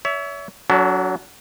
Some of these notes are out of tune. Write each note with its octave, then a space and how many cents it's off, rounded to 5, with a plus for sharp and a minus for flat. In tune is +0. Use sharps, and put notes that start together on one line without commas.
C#5 +35 E5 +0
F#3 +5 D4 -45 A4 +0